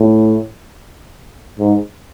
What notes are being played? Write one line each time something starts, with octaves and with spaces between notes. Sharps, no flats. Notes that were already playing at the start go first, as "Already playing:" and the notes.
Already playing: A2
G#2